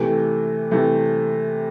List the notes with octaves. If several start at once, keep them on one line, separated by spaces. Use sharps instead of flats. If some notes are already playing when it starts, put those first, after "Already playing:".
Already playing: C3 E3 A3
C3 E3 A3